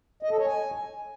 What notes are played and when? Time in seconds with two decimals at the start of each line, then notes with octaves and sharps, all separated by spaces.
0.23 D#5
0.30 A4
0.38 C#5
0.46 G#5